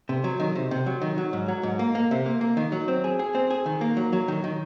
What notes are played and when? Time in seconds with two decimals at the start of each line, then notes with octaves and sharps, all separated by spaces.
0.09 C3
0.24 F#3
0.40 D#3
0.55 C3
0.71 C3
0.86 F#3
1.02 D#3
1.18 F#3
1.33 G#2
1.48 F#3
1.63 G#2
1.79 A#3
1.95 A#3
2.11 C3
2.26 A#3
2.41 A#3
2.57 D#3
2.72 F#3
2.88 C4
3.04 G#4
3.19 G#4
3.35 C4
3.50 G#4
3.66 D#3
3.81 A#3
3.97 F#3
4.13 F#3
4.28 D#3
4.44 D#3